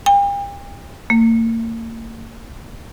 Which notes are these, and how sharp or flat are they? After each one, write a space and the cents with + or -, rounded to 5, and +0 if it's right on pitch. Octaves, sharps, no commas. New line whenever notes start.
G5 +40
A#3 -40